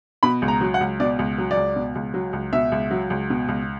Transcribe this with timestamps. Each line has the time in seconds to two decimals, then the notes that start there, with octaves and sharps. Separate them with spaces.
0.23 B2 B5
0.42 C#2
0.48 A#5
0.61 F#3
0.74 F#5
0.81 C#2
1.00 B2 D5
1.19 C#2
1.38 F#3
1.51 D5
1.57 C#2
1.76 B2
1.95 C#2
2.14 F#3
2.33 C#2
2.53 B2 E5
2.72 C#2
2.91 F#3
3.10 C#2
3.30 B2
3.49 C#2